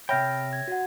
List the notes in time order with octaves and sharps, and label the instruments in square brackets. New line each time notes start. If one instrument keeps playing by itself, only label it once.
[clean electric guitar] C3 G5 [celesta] C#5 E5 A#6 [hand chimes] B5 F6
[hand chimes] G#6
F#4 F#5